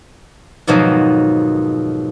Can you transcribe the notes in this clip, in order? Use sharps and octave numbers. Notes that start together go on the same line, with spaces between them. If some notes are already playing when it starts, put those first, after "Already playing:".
F2 G#2 B2 D#3 F3 F#3